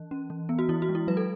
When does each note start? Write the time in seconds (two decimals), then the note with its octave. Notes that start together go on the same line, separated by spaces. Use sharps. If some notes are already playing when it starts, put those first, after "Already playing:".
Already playing: E3
0.11 C#4
0.30 E3
0.49 B3
0.59 F#4
0.69 E3 E4
0.82 F#4
0.89 G#3
0.95 E4
1.07 F#3 B4
1.17 A4